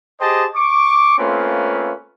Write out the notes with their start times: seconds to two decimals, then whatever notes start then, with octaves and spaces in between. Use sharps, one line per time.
0.21 G4 G#4 C5 D#5 G5 A5
0.56 C#6 D6
1.19 A3 A#3 C4 C#4 F4 B4